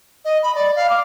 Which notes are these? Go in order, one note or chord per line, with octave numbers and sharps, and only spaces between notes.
D#5
B5
D5
F5
D6